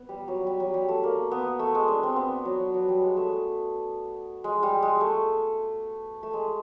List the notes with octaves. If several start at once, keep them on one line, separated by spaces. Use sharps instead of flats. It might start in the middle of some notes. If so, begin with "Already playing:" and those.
Already playing: B3
G3
F#3
G3
F#3
G3
A3
A#3
B3
A3
G#3
D4
C4
B3
F#3
F#3
G3
G#3
A3
G#3
G3
G#3
A3
A3
G#3